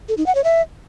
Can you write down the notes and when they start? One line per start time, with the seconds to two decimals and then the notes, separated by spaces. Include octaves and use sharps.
0.09 A4
0.17 D#4
0.26 F#5
0.35 C#5
0.44 E5